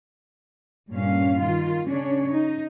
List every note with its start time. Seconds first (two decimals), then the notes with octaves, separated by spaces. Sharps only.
0.91 G2 A#2 C#4 F5
1.43 D#3 F4
1.87 C#3 C#4 D4 C#5
2.32 D#4